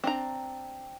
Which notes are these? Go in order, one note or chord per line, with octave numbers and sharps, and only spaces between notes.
C4 D4 A#5